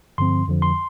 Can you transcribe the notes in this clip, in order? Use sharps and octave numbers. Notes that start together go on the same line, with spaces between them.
G2 D3 F3 C4 C6
F2 D3 F3
C6